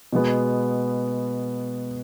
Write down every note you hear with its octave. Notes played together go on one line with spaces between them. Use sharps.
B2 G#3 B3